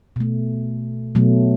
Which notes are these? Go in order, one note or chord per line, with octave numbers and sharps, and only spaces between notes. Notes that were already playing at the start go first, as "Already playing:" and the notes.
B2 A3
B2 F#3 A3